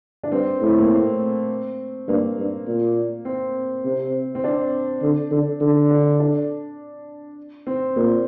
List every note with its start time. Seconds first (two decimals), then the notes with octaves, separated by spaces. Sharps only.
0.23 D4
0.32 G2 C4
0.61 A2
0.66 A3
0.79 A#3
0.91 C4
2.08 G2 A#3
2.38 G2
2.67 A#2
3.25 C4
3.85 C3
4.35 C4
4.44 D4
5.02 D3
5.31 D3
5.61 D3
5.90 D4
6.20 D4
7.67 C4
7.96 A#2 A#3